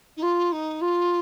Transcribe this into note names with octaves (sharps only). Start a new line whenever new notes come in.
D#4
F4
D#4
F4